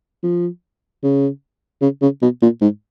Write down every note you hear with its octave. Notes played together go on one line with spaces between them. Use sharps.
F3
C#3
C#3
C#3
B2
A#2
G#2